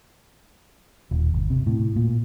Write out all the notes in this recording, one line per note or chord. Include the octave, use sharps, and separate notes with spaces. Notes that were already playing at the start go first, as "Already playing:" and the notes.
D#1
G1
C3
A2
A#2